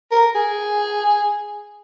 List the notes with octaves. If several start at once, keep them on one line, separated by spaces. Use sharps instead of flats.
A#4
G#4